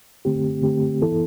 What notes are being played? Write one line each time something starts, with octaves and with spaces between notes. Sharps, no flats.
D3 A3 C4 G4
D3 A3 C4 G4
E3 B3 E4 A4